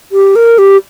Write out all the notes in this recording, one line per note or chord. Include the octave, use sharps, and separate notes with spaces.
G4
A#4
G4